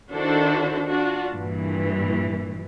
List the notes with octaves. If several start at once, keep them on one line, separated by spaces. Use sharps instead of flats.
D#3 D4 E4 F#4 A4 C5
D4 F4 F#4
G2 A#2 E3